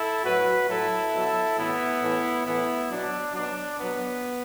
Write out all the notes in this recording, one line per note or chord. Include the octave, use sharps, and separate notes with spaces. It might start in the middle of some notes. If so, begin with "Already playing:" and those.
Already playing: E4 A4
A2 F#3 F#4 B4
A2 F#3 E4 A4
B2 F#3
A2 E3 B3 E4
A2 E3
A2 E3 B3 E4
B2 F#3 D4
B2 F#3 D4
B2 F#3 B3